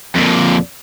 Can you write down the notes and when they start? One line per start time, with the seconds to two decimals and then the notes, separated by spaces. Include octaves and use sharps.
0.16 F2 A#2